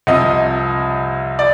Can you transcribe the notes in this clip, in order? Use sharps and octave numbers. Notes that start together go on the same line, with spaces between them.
C2 C3 F3 D#5
D5